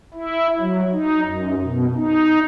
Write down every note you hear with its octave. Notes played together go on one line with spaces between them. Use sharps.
E4
F#3
D#4
F#2
B2
D#4